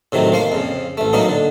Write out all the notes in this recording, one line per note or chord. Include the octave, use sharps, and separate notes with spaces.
A2 C3 D#3 F#3
F3 A#3 F5
F2 C#3
A1 A3
A#2 F#3 A#3 B3 D#4
D3